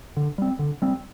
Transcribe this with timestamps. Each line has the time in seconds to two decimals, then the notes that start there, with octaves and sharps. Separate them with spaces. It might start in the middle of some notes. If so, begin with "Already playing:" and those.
0.17 D3
0.38 G3 C4
0.59 D3
0.82 G3 C4